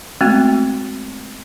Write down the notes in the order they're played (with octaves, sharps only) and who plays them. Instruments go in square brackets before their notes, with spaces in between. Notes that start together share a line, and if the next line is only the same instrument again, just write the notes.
[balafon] G#3 A3 B3 C4 F#4